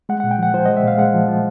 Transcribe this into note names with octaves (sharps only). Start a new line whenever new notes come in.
G#3 F#5
A#2 F#5
G5
F3 F#5
F3 C5
G#3 D#5
E5
A#2 F5
G#3 F#5
F3
F3